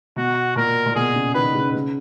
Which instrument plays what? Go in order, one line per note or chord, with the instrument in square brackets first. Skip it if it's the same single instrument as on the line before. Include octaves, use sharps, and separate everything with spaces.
[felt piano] B2 [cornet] F#4
[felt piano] A#2 [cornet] A#4
[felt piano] A#2
[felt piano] B2 [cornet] G#4
[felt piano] C#3
[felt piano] D#3 [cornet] B4
[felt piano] C#3
C#3